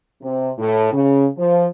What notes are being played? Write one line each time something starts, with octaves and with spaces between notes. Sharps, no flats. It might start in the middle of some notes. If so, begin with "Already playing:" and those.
C3
A2
C#3
F3